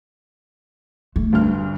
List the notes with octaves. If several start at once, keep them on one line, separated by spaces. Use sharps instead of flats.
A3
D2 G2 F6